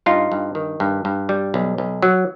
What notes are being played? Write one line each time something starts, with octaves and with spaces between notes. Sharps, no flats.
G2 D#4 F4
G2
D#3
G2
G2
G3
B1
B1
F#3